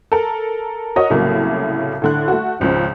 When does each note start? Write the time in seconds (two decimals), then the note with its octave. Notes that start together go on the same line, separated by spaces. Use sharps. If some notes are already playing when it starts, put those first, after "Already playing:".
0.12 A4 A#4
0.96 F#4 A#4 C#5 D#5
1.10 C2 A2 C#3 F#3 A#3
2.02 A2 D3 F#6
2.28 A3 F#4
2.60 G#1 C#2 C#3 F3